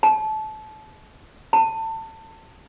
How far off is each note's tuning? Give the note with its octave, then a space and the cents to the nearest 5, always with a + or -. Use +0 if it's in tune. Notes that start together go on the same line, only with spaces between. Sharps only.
A5 -25
A5 +25